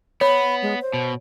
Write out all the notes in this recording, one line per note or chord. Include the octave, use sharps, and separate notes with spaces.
B3 C#5 B5
G#3
C5
B2